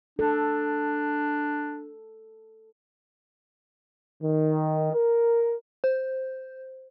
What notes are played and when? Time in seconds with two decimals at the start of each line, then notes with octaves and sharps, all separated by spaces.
0.19 D4 A4
4.22 D#3
4.92 A#4
5.84 C5